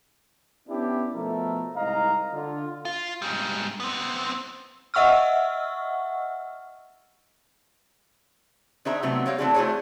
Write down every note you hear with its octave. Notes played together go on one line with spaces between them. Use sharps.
B3 C#4 D4 E4 G4
B2 F3 A3 A4 A#4 E5
C2 G#2 D#5 F5 A#5
D3 F4
F4
G#2 G3
B3 C4
D#5 E5 F#5 C#6 E6 F6
D#3 D4 G#4 C5 E5 A#5
C3 F#3 A3 B3 C4
G3 A#3 C#5 F5
E3 A3 C4 D4 F#4 G#4
A3 E4 F#4 G#4 C5 C#5